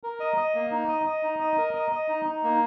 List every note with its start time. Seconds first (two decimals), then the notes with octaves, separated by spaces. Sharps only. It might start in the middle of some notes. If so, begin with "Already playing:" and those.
0.03 A#4
0.20 D#5
0.37 D#5
0.55 A#3
0.71 D#4
0.88 D#5
1.06 D#5
1.23 D#4
1.40 D#5
1.58 A#4
1.75 D#5
1.92 D#5
2.09 D#4
2.25 D#4
2.43 A#3